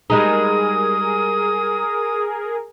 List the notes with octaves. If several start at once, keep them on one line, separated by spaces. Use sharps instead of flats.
G3 G#3 D#4 G#4 A#4 D#6